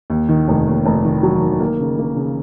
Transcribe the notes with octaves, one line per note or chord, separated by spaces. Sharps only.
D#2
D#3
F1
D#2
F1
D#3
F#3
D#3
A#3
C#3
A#3
C#3